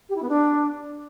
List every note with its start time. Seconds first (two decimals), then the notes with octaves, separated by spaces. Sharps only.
0.09 G4
0.15 E4
0.22 B3
0.28 D4